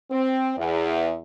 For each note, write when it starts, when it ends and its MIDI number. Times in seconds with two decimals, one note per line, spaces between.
0.11 0.53 60
0.58 1.18 40